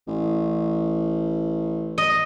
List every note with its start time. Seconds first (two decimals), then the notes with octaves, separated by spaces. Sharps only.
0.07 A1
1.98 D#5